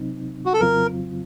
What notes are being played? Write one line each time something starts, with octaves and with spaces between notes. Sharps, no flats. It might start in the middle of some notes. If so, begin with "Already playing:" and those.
Already playing: C3 F#3 C4 D#4
F#4
A4
F2 C#3 F#3 C4 F4 A#4